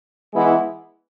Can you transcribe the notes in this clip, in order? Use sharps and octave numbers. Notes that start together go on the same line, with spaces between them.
E3 G#3 B3 E4